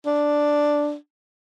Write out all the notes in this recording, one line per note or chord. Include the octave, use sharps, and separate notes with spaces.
D4